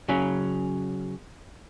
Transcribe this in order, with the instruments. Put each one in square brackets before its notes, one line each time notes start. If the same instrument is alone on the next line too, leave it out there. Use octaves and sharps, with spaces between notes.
[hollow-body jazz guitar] C#3 F#3 C#4